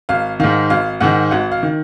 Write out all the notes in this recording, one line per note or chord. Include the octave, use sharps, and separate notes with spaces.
G#1 F5
G#2 D#3 F5
G#1 F5
G#2 D#3 F#5
G#1 F#5
F5
D#3